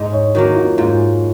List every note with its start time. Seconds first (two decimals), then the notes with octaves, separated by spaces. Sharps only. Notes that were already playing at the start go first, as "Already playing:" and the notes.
Already playing: G#2 D#5
0.12 C#5
0.35 D#3 F#3 A#3 F#4
0.55 F4
0.77 G#2 F4